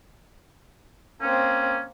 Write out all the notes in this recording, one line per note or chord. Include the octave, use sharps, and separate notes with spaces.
A#3 C4 C#4